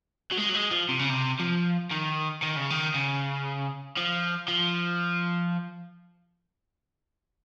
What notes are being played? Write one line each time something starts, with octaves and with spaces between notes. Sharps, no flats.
F#3
G#3
F#3
G#3
F3
C3
C#3
C3
F3
D#3
D#3
C#3
D#3
C#3
F3
F3